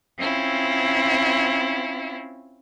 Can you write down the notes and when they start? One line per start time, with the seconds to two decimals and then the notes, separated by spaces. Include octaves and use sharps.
0.17 C4 C#4 E4 F4